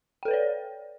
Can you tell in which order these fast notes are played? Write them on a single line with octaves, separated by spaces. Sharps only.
G5 A4 B4 C#5 D5